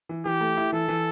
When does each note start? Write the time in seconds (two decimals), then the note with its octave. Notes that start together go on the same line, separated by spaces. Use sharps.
0.09 E3
0.25 E3 G4
0.41 A3
0.57 E4
0.72 E3 A4
0.88 E3